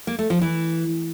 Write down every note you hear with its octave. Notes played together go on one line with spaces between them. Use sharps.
A#3
A3
F3
E3